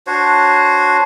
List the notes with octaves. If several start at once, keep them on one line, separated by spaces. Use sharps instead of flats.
D4 F#4 C5 C#5